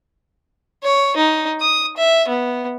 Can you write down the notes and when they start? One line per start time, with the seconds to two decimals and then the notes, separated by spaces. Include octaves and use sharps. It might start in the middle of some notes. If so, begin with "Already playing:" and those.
0.83 C#5
1.16 D#4
1.60 D#6
1.97 E5
2.28 B3